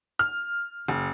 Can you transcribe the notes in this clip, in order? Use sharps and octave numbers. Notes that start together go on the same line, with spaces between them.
F6
F#1